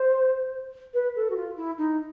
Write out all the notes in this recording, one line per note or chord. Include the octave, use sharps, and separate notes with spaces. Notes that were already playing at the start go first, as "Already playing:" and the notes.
Already playing: C5
B4
A4
F#4
F4
E4
D#4